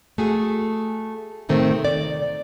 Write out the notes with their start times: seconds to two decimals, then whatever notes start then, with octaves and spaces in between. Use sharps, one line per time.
0.18 A3 F#4 G#4
1.49 A2 C3 D#3 A3 C4
1.85 D5